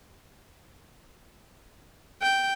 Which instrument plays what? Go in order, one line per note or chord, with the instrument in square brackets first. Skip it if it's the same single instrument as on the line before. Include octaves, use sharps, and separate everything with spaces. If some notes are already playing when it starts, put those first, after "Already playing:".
[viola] G5